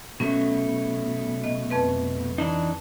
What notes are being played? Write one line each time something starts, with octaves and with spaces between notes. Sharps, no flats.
B2 F#3 A3 C#4
D#5
F2 C4 B4
E3 D4 D#4